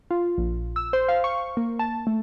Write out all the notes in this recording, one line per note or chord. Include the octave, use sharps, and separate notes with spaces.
F4
A#1
E6
C5
F5
C#6
A#3
A5
A3